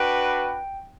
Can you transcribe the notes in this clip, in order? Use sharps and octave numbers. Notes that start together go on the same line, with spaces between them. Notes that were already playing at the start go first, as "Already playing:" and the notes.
Already playing: D4 F#4 B4 G5